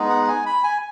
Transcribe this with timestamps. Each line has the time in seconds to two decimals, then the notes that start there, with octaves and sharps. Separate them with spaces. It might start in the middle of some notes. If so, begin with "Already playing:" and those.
Already playing: G#3 B3 D#4
0.10 F#5
0.28 G#5
0.46 B5
0.64 G#5